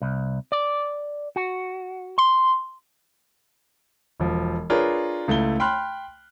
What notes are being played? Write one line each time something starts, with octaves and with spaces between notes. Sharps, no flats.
C2
D5
F#4
C6
E1 F3
D4 F4 G#4 A#4 B4 C#5
C#2 A3 E4 G7
G5 B5 C6 F6 F#6